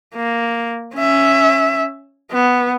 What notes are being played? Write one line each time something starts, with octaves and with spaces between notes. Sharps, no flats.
A#3
C#4 E5
B3